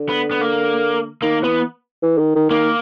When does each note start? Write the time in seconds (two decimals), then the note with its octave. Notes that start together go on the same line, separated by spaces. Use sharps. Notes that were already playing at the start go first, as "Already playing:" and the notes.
Already playing: D3
0.09 B3
0.31 B3
0.41 A#3
1.22 D#3 A#3
1.44 E3 B3
2.03 E3
2.18 D#3
2.36 D#3
2.50 D#3 A#3